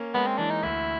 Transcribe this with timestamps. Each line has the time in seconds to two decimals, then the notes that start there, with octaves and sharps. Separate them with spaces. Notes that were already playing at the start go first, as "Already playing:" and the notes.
Already playing: A#3 C#4
0.14 G#3 B3
0.26 C4
0.38 E3 D4
0.50 D#4
0.63 D2 E4